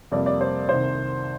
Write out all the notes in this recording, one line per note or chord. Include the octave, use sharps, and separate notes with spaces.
F2 C3 G3 A#3 D5
D5
C5
C2 C3 D#3 C5